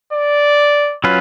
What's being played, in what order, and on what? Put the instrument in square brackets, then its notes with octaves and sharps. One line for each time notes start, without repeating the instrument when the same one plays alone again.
[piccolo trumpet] D5
[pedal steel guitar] F#3 C#4 F4 B4